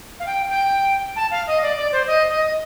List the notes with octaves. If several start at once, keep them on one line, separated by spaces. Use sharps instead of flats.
F5
G5
G5
A5
F5
D#5
D5
D5
C5
D#5
D#5